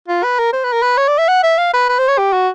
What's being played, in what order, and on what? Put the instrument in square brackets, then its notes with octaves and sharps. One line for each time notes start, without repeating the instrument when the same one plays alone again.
[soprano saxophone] F4
B4
A#4
C5
B4
A#4
B4
C#5
D5
E5
F#5
E5
F5
B4
B4
C5
C#5
G4
F#4